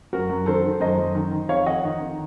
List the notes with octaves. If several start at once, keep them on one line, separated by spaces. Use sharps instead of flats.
F#2 F#4 A#4
F#2
D#3 A4 C5
D#3
F#2 C5 D#5
F#2
D#3
D#3
F2 C#5 F5
F2 D#5 F#5
D#3
D#3